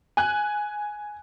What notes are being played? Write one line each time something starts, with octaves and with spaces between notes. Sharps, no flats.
G#5 F#6